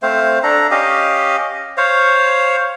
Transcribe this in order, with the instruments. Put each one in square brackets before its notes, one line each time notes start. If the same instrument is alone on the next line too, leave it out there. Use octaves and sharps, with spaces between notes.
[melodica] A3 C4 C5 F5
D4 A4 A#5
C#4 G4 D#5 F5
C5 C#5 F5